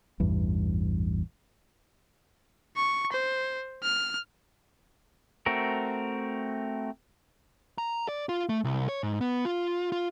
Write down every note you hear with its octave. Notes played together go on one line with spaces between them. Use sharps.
A1 E2 G2
C#6
C5
F6
A3 C4 F#4 A#4
A#5
D5
F4
A3
C2
C#5
G#2
B3
F4
F4